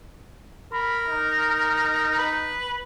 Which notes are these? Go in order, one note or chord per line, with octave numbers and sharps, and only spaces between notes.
A#4 B5
D#4
B4